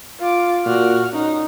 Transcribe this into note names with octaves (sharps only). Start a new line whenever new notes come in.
F4 D6
A#2 F#4 F6
C#4 D#4